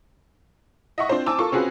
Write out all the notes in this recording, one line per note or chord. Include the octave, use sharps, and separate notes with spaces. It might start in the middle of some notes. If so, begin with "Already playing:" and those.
D#5 E5 F#5 C#6
C4 D4 F4 C5
C4 G#5 A5 D6 E6
F4 A4 A#4 C#6
C4 C#4 F4 F#4 G#4 B4